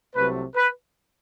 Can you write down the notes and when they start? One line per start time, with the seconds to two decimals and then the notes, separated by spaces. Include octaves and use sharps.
0.15 C2 C3 F#3 A3 B4
0.55 B4